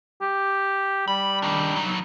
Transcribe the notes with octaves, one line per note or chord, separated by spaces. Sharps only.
G4
G3 B5
D#3 D4
F#3 D#4